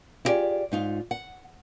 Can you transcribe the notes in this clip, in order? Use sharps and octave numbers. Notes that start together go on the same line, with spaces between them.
E4 F4 G4 G#4 D5
G#2 D#4 F4
F#5